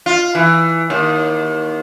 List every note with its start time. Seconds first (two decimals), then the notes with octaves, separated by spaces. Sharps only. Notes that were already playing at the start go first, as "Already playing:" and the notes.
0.06 F4
0.35 E3
0.90 D#2